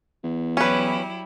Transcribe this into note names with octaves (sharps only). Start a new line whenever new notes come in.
E2
F#3 G3 C#4 E4 B4